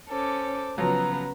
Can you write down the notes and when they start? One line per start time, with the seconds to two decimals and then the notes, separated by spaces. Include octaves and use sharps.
0.10 C#4 A4 C5 D6
0.78 C#3 F3 F#3 B3 B4 A#5